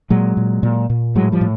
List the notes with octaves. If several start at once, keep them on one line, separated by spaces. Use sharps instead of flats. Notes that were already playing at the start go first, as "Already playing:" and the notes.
A#2 F#3 G#3
A#2
A#2
A#2
A2 F#3 G#3
F3 G3
A2